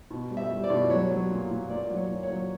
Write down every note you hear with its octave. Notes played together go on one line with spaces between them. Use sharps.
B2
G3
E5
G3
D5
B2
F#3 C#5
F#3
A#2
A#2
A#2 D5
F#3
C#5
A#2
C#5
F#3